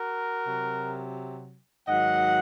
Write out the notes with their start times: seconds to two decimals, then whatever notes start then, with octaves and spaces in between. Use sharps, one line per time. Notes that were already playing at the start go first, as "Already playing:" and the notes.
Already playing: F#4 A#4
0.46 C3 F#3
1.87 G#2 D#3 F#3 D#5 F#5